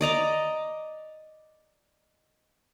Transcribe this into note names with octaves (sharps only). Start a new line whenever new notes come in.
D5 D#5 A#5 D6